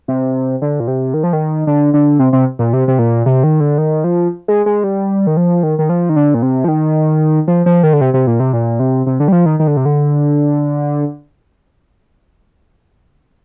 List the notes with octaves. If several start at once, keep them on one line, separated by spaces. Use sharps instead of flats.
C3
D3
A#2
C3
D#3
F3
D#3
D3
D3
C3
C3
A#2
C3
C3
A#2
C3
D#3
D3
D#3
F3
G#3
G#3
G3
D#3
F3
D#3
D#3
F3
D#3
D3
A#2
C3
F3
D#3
F3
F3
D#3
D3
C3
C3
A#2
C3
A#2
C3
C3
D3
G3
F3
D#3
D#3
D3
C3
D3